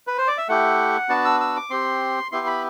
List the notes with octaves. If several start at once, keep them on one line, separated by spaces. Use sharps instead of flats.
B4
C5
D5
E5
A3 E4 G4 F#5
B3 D4 F#4 A5
E6
E6
D6
C4 G4 C6
B3 E4 G4 C6
B5